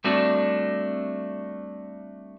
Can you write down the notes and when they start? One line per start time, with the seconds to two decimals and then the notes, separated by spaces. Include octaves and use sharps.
0.04 G3 A3 C4 D4 F#4